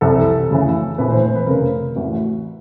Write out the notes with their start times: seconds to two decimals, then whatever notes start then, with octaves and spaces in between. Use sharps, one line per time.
0.01 C2 C3 E3 A4
0.50 D2 C#3 E3
0.98 A#1 A2 E3 B4
1.11 C5
1.23 C5
1.35 B4
1.47 F1 F2 C#3 A#4
1.96 A1 A2 E3 F#4